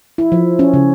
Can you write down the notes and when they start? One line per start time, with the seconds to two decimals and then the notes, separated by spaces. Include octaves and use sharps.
0.18 E4
0.32 F3
0.59 C#4
0.74 C#3